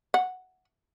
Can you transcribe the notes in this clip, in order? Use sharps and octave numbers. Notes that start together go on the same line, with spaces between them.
F#5